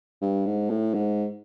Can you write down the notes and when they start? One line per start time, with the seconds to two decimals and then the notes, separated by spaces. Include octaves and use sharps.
0.22 G2
0.46 G#2
0.70 A2
0.94 G#2